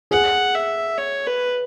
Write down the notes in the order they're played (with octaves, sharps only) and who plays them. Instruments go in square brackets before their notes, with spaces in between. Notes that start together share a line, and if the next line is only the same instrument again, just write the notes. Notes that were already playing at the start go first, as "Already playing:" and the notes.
[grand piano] G#4 [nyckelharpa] F#5
[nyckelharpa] E5
C#5
B4